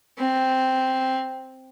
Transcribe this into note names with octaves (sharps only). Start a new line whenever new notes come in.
C4